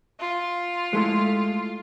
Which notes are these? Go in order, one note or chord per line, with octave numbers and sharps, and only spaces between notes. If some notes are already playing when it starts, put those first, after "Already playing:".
F4
G#3 A3 E4